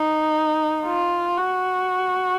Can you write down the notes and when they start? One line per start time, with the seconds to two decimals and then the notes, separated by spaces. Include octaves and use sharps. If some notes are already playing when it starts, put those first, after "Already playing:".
Already playing: D#4
0.85 F4
1.37 F#4